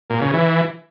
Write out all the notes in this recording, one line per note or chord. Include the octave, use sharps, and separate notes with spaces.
A#2
C#3
E3